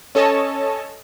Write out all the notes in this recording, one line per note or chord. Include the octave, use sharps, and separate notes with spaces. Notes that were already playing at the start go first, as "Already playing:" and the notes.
C#4 A4 C#5 D#5 A5